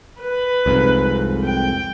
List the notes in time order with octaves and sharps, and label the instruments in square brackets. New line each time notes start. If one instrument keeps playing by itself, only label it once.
[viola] B4
[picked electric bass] C2 F2 G#2
[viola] G5